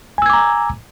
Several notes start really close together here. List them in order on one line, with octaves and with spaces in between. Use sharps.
G#5 E6 G#6 D6 A#5